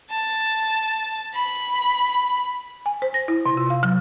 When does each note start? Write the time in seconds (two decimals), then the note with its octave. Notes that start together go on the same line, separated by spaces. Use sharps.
0.10 A5
1.34 B5
2.86 G#5
3.02 C5
3.14 A#6
3.28 E4
3.46 C3
3.57 F4
3.70 F5
3.83 F#3